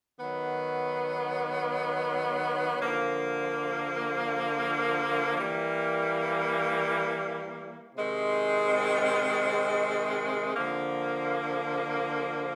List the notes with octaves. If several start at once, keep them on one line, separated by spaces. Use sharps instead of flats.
D#3 F#3 B3
D3 F3 A#3
E3 G3 A#3
C3 D#3 G#3 C4
D3 F3 A#3